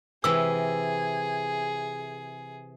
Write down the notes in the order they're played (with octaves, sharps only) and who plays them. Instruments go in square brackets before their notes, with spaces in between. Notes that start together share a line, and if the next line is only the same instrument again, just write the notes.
[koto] C3 E3 [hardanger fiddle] G#4 [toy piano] E6